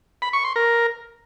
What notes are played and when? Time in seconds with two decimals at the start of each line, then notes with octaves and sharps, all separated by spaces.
0.22 B5
0.33 C#6
0.44 C6
0.56 A#4